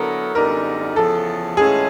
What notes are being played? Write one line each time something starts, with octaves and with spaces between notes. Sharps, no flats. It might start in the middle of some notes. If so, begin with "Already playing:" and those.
Already playing: D3 F#3 B3 E4 A4 A#4
F#2 D3 G3 B3 D#4 A#4
E2 C#3 F3 A4
A2 E3 G#3 C#4 F4 G#4